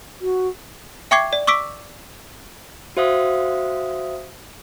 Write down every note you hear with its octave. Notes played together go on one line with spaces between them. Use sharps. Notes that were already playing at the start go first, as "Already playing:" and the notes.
F#4
E5 G5 C#6 D6 G#6 C7
D5
C#6 D6 E6 B6 D7
F#4 C5 E5 F5 D#6